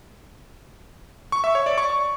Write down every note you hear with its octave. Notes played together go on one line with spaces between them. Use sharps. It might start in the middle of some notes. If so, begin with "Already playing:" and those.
C#6
E5
C#5
D5
C#6